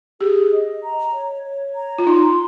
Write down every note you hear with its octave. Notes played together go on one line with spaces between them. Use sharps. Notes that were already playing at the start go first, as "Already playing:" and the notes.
G4 G#4
D#5
A#5
C#5
C#5
A#5
F4
D#4 C6